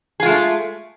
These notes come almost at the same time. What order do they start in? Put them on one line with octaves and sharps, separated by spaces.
G#4 F4 G#3 A3